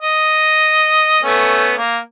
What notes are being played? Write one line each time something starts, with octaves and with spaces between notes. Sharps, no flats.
D#5
A3 B3 C#4
A#3